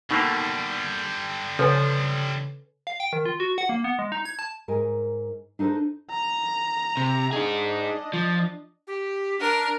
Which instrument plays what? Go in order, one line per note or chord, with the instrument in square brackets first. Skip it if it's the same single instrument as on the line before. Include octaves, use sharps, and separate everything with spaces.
[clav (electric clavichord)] B2 A3 A#3 [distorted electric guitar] D3 G3 [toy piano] D#4
[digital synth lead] C#3 [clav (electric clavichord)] F3 [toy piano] A4 B4 G#5
[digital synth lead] F5
G5
D#3
F4
F#4
F#5
A#3
B3
G#3
D#4
G#6
A5
[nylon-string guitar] G#2 A#4 G#5
D4 D#4 A4 C5
[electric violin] A#5
[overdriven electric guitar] C3
[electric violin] D4 D#5 [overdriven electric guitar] D#4 G#4
[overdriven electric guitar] F3
[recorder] G4
[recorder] D4 [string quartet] A#4